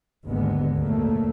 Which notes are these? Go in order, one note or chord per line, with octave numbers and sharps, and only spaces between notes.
G#1 D#2 D3 G#3 B3
F#1 D2 A#2 F#3 A3 A#3